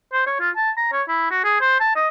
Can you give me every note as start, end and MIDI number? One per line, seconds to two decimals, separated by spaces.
0.13 0.23 72
0.27 0.37 73
0.40 0.50 65
0.56 0.71 81
0.77 0.92 82
0.93 1.03 73
1.08 1.29 64
1.31 1.39 66
1.44 1.56 68
1.61 1.77 72
1.80 1.95 81
1.96 2.08 75